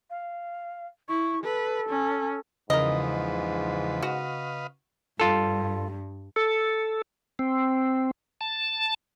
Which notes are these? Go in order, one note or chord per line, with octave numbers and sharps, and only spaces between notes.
F5
E4 C#6
A4 B4
C#4
E2 G#2 C#3 F3 A#4 B4 D#5
F#4 B4 D#5 F5
G2 F4 A4
A4
C4
A5